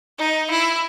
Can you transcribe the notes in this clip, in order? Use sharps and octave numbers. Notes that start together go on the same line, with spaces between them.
D#4
E4